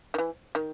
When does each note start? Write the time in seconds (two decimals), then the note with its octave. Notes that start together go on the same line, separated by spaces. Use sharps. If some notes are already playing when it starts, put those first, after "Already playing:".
0.14 D#3
0.18 E3
0.55 D#3